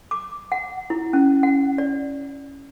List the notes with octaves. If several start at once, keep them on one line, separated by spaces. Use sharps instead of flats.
D6
F#5
E4
C#4
F#5
D5